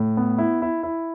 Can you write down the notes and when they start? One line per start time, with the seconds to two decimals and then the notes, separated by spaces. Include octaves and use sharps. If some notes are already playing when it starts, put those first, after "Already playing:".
Already playing: A2
0.17 B3
0.38 E4
0.62 E4
0.83 E4